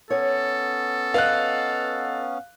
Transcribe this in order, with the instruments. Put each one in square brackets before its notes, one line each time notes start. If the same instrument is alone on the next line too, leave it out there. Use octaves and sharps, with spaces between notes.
[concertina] B3 C#4 [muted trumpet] A4 [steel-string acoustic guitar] C#5
[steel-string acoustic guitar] B4 D#5 F#5 [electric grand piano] F5 F#6